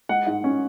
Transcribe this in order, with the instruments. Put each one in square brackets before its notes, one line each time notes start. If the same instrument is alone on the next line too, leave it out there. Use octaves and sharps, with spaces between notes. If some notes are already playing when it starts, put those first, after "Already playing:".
[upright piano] G#3 F#5
G#2
C#4